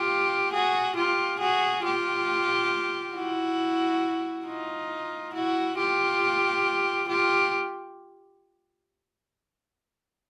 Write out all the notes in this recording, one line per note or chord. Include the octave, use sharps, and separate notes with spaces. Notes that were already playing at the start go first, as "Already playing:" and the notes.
Already playing: F4 G4
F#4 G#4
F4 G4
F#4 G#4
F4 G4
E4 F#4
D#4 F4
E4 F#4
F4 G4
F4 G4